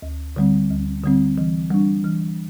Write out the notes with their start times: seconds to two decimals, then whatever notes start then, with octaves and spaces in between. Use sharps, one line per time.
0.02 D2
0.36 D3 G3 C4
0.70 D2
1.04 D3 G3 C4
1.38 E3
1.71 G3 D4
2.04 E3